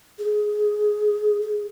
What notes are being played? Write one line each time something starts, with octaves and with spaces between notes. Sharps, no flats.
G#4
G#4